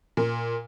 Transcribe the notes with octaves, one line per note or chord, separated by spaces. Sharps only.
A#2